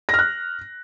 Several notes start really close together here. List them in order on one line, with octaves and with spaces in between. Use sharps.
A#6 F6 F#6